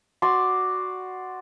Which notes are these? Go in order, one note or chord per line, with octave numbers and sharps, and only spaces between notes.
F#4 D5 C6